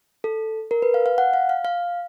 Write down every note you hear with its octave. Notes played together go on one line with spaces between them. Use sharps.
A4
A#4
B4
F5
F5
F#5
F5
F5
F5